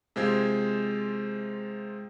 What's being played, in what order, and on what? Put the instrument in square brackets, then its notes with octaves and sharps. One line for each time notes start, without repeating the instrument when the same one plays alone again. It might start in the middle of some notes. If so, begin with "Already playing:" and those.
[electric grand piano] C3 G#3 F4 C5 G#6